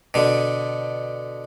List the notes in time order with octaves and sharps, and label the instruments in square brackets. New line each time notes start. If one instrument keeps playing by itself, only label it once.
[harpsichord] B2 D3